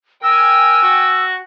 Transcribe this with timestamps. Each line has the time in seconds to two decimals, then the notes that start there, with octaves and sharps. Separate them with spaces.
0.23 A#4 G5 G#5 E6
0.83 F#4